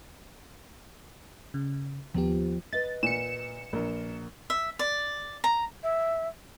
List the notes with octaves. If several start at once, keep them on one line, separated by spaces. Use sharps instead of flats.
C#3
D#2 F3 B3 G4
B4 D#5 A6
A#2 C#7 E7
A#1 A#4
E5
D5
A#5
E5